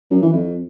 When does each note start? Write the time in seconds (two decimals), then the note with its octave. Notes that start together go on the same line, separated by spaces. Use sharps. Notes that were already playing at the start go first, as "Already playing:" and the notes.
0.11 F#2
0.22 E3
0.33 F2